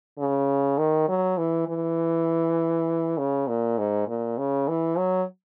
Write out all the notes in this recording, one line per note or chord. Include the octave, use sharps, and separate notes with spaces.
C#3
D#3
F#3
E3
E3
C#3
A#2
G#2
A#2
C#3
E3
F#3